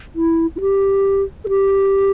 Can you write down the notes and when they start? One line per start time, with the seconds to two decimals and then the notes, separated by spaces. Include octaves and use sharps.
0.15 E4
0.56 E4
0.60 G4
1.45 A4
1.48 G4